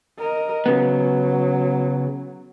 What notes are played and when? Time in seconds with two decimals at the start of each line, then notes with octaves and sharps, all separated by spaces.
0.18 A#4 D#5
0.66 C#3 F#3 B3